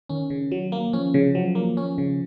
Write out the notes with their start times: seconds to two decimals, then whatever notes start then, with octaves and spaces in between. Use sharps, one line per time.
0.09 D#3 C#4
0.30 C#3
0.52 F#3
0.72 A#3
0.93 F3 C#4
1.14 C#3
1.35 F3 F#3
1.55 A#3
1.77 C#4
1.98 C#3